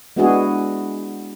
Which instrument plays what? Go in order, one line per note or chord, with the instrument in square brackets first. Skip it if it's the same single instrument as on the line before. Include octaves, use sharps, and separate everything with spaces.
[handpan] G#3 B3 D4 E4 F#4 G#4